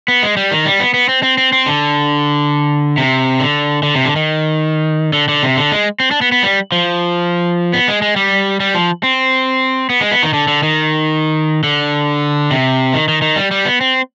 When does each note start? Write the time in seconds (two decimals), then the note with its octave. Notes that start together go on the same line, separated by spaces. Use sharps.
0.08 B3
0.22 G#3
0.37 G3
0.51 D#3
0.66 G3
0.80 B3
0.94 B3
1.09 C4
1.23 C4
1.38 C4
1.53 C4
1.66 D3
2.97 C3
3.40 D3
3.83 D3
3.95 C3
4.05 D3
4.16 D#3
5.13 D3
5.28 D3
5.43 C3
5.57 D3
5.72 G#3
6.00 C4
6.11 D4
6.21 B3
6.32 B3
6.43 G3
6.72 F3
7.73 B3
7.88 G#3
8.02 G#3
8.16 G3
8.60 G3
8.74 F3
9.03 C4
9.90 B3
10.01 G#3
10.11 B3
10.23 D#3
10.33 D3
10.48 D3
10.63 D#3
11.63 D3
12.51 C3
12.94 D#3
13.08 D#3
13.22 D#3
13.36 G3
13.51 G3
13.65 B3
13.81 C4